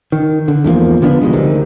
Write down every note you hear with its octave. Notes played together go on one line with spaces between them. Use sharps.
D#3
D3
E2 G#2 F3 A#3
D3 F3 B3 D4
F1 B1 G2 G#3
D2 C3 D#3